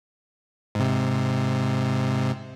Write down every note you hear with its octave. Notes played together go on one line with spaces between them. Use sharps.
G#2 C3